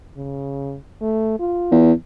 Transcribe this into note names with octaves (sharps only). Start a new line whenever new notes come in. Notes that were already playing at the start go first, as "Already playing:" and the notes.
C#3
A3
F4
E2